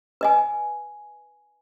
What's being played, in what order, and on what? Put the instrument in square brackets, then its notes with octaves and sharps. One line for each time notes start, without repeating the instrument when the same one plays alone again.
[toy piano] B4 D#5 G#5